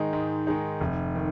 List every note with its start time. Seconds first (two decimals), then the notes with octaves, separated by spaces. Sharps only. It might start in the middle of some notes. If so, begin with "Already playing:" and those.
Already playing: G#2 D#3 G#3 D#4
0.13 G#2
0.47 D#3 G#3 D#4
0.81 F1
1.15 D#3